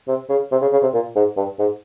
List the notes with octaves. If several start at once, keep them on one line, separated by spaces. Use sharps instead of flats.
C3
C#3
C3
C#3
C#3
C3
A#2
G#2
G2
G#2